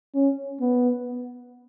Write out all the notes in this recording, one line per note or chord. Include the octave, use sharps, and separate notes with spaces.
C#4
B3